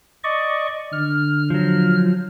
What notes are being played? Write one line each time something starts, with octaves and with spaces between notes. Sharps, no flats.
D5 D#5 C#6
D3 F6
F3 F#3